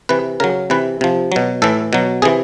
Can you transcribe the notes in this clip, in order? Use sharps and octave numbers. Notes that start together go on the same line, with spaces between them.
C3 E3 B4
C#3 F#3 A#4
C3 E3 B4
C3 F3
B2 F#3
A2 E3 A4
B2 F#3
C3 E3 G#4